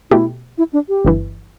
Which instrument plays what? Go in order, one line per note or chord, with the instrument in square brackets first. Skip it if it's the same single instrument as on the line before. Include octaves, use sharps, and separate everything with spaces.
[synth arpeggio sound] B2 A3 G4 [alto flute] E4
[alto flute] E4
D4
G4
[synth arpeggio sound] G1 G2 E3